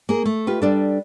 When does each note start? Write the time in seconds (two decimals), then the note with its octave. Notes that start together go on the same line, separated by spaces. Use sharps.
0.09 A#3 G#4
0.26 A3
0.47 F4 G4 B4
0.62 G3 D4 A4